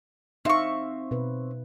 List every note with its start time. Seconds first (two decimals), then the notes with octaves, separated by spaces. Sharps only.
0.45 C4 D#4 E5 F5 C#6
1.11 B2 B4